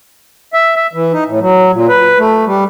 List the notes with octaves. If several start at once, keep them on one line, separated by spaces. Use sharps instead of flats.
E5
E5
E3
D#4
A2
F#3
A#2
B4
A3
G3